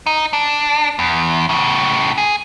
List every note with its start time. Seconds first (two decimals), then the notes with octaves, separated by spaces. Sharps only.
0.06 D#4
0.33 D4
0.99 E2
1.49 A2 C#3
2.18 G#4